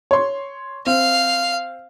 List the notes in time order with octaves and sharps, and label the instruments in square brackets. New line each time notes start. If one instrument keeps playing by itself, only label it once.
[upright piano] C#5 C6
[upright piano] C4 [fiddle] F5